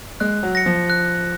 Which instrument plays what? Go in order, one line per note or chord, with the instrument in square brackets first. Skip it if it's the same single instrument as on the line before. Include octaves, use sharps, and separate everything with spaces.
[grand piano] G#3 [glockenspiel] F#6
[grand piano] F#3
[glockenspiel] A#6 C#7
[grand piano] F3
[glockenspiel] F#6